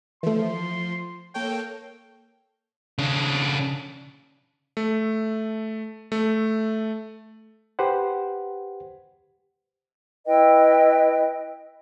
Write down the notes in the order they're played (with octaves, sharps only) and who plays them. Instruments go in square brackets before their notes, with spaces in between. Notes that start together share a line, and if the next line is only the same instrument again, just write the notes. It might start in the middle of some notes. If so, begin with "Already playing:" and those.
[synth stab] E3 A3 [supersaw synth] F3 [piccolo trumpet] C6
[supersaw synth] A#3 A4 C#5 [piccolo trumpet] G5
[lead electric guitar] C#3 D4
[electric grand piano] A3
A3
[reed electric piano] G4 B4 C5 F#5
[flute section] E4 B4 D#5 G5